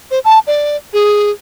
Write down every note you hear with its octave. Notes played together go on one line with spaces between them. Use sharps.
C5
A5
D5
G#4